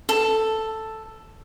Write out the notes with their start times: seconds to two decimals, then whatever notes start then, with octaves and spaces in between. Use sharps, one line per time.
0.09 A4